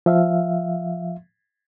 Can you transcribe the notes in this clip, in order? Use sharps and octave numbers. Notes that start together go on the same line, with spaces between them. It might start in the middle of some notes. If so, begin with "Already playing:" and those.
F3 E5 F5